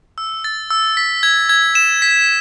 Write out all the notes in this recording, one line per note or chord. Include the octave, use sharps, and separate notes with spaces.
E6
A6
E6
B6
G#6
G#6
E7
B6